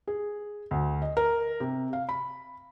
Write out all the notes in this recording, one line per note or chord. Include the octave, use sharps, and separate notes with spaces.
G#4
D2
D#5
A#4
C3
F5
B5